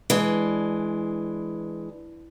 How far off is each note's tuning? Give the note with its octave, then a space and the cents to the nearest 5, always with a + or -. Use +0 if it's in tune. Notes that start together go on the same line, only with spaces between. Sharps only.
E3 +5 G#3 +15 D4 +0